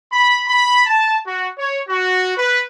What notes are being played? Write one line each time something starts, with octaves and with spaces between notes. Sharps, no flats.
B5
B5
A5
F#4
C#5
F#4
B4